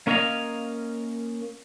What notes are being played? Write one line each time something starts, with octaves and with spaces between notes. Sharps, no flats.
A#3 C#4 A#4 C#5 D#5 F5